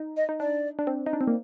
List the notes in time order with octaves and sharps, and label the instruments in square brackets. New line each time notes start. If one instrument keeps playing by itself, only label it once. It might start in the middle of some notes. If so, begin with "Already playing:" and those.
Already playing: [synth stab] D#4
[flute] D#5
[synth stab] D#4
[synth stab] D4 [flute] D5
[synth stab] D4
C4
D#4
D4
C4
A#3